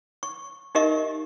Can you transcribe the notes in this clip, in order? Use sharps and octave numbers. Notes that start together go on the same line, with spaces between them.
C#6
D#4 G4 A#4 D#5 E5 C#6